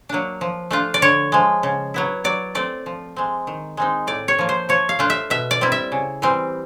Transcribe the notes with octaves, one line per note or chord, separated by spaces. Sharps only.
F#3 A#3 D4
F3
A3 D4 F4
D5
D3 C#5
F3 G#3
C#3
F#3 B3 E4
F#3 D5
A3 C4 D5
F3
G#3 C4
D#3
G#3 C4 D#4
A2 D5
C#5
F3 A#3
C5
F3 C#5
F5
A3 D4 F4
E5
B2 E5
D5
G3 C4 E4
E5
C#3
E3 G3 C4